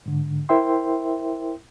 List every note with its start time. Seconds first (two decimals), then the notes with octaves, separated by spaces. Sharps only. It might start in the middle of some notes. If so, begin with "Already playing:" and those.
0.06 G#2 D3
0.49 E4 A#4 C5 E5 G5 C6